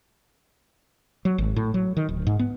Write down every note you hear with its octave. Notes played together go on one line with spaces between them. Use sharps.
F#3
G#1
A2
F#3
D#3
D1
G#2
B3